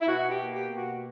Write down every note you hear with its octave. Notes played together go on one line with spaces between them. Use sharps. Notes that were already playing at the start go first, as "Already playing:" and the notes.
E4
B2 F#4
G4
A#3
G4
B2
F#4